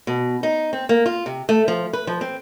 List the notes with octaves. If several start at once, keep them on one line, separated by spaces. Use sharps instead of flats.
B2
D#4
C4
A#3
F4
C3
A3
F3
B4
F3
C4